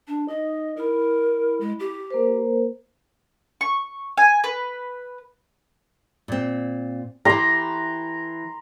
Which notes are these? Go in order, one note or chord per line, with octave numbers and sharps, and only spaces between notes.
D4
D#4 D#5 D#6
E4 A#4 B5
G#3
G4
A#3 A#4 C5
C#6
G#5
B4
A#2 C4
E3 G4 A#5 C6